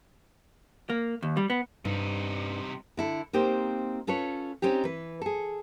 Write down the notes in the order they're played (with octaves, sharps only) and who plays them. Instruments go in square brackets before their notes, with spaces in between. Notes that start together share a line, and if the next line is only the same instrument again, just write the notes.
[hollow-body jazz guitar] A#3
D#2
G3
B3
[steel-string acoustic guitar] G2 [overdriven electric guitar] C3 D#4
[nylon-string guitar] D3 E4 A4
A#3 C4 D#4 G4 C5
C#4 F4 A4 B4 C#5
C4 C#4 D#4 G4
E3 B4
G#4 A4